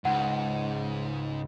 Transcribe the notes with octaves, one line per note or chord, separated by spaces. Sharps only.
C#2 G#2 F#5